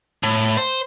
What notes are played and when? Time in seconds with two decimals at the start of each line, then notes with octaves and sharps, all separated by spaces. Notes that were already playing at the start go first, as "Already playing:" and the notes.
0.23 A2
0.57 C5